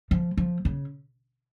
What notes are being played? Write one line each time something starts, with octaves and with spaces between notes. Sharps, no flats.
F3
F3
C#3